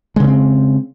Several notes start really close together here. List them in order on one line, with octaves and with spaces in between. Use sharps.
G#3 C#3 C#4 C4